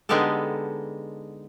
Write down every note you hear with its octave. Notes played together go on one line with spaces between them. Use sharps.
D3 G#3 B3 D#4 G4 A4